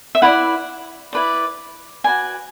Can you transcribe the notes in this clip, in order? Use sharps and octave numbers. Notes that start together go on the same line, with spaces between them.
E5
E4 B4 D5 F#5
E4 B4 D5
F#4 B4 D5 G#5